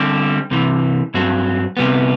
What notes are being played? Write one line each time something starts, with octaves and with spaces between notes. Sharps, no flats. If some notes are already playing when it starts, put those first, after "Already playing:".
Already playing: D3 G3 C4 G4
C2 C3 E3
G2 F#3 C4
C3 G3 B3